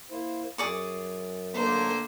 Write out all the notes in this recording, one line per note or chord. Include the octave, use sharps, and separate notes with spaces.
A#3 E4 C5
F#2 G#4 D5 C#6
D3 A3 A#3 C5